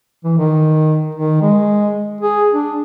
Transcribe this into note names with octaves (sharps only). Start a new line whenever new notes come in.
E3
D#3
D#3
G#3
G#4
D4